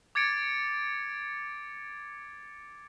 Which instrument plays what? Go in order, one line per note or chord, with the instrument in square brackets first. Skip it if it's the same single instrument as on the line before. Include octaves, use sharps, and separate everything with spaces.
[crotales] D6 G#6 A6 C#7 D7